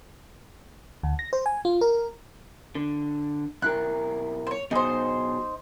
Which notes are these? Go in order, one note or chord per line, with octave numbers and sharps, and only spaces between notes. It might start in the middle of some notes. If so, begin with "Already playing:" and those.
D2
A#6
C5
G#5
F4
A#4
D3
B1 E4 A#4 F#6
C5 C#5
B2 F#3 D#4 G#4 C5